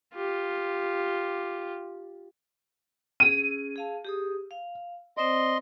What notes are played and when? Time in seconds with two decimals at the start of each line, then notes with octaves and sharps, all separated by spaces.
0.14 F4 G4
3.20 C#4 G#4 D#7
3.76 G#4 F5 A5
4.05 G4 G#4 D#6
4.51 F5
5.17 C4 C5 D5 D#5 C6